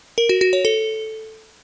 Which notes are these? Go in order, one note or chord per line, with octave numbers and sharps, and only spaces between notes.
A#4
F#4
F#4
C#5
A4